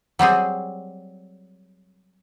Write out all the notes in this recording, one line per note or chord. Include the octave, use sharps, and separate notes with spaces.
F#3 G3 C4 G#4